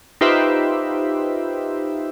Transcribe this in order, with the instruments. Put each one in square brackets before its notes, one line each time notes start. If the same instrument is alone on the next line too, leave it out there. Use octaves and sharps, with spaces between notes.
[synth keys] D#4 F4 G4 B4 C5 E5